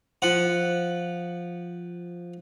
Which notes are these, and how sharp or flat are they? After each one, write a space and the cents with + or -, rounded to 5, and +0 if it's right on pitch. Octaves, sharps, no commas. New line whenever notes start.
F3 +0 F#5 +0